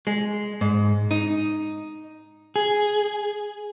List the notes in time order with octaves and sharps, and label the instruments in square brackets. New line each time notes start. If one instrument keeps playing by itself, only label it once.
[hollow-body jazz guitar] G#3
G#2
D#4
[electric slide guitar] G#4